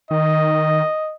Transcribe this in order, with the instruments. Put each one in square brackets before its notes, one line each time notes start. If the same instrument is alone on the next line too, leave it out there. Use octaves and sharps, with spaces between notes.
[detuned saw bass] D#3 [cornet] D#5